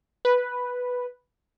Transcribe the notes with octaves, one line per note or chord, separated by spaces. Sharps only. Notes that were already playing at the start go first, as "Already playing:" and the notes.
B4